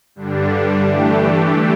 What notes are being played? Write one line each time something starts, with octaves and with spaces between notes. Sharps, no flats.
G2 D3 G3 D4
E3 A3 D4 G4